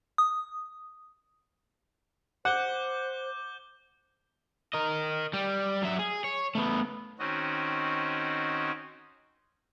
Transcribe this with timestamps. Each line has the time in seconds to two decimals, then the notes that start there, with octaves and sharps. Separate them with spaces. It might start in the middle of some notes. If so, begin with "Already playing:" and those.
0.18 D#6
2.45 C5 F#5 D6 G6 G7
4.73 A#4 D#5
5.33 G3
5.82 F#3 E5
5.99 G#4
6.24 C#5
6.55 A3 B3
7.19 D#3 C4 C#4 F#4 D#5